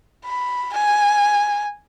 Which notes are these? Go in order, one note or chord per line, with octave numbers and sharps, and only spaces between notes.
B5
G#5